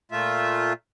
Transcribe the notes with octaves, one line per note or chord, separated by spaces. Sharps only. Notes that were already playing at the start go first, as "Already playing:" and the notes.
A#2 A3 F4 E5